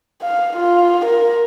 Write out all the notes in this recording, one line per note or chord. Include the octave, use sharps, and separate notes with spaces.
F5
F4
A#4